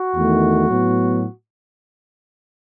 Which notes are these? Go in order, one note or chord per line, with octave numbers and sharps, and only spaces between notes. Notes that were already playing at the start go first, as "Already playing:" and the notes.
Already playing: F#4
E2 D#3 A3
A2 F#3 B3